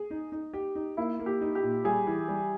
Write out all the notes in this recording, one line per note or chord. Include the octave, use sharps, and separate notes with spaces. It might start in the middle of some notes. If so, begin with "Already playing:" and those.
Already playing: G#4
D#4
D#4
G4
D#4
A#3 E4
A#3
G4
D#4
G4
A#2
G3 G#4
E3
G3